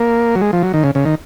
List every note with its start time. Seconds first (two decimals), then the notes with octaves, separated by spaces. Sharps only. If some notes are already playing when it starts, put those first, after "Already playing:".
Already playing: A#3
0.35 F#3
0.41 G#3
0.53 F3
0.63 F#3
0.74 D#3
0.84 C#3
0.95 C#3
1.05 D#3